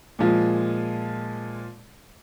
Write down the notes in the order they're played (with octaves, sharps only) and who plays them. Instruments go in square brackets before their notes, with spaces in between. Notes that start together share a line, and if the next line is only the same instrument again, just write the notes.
[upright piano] A#2 F3 G#3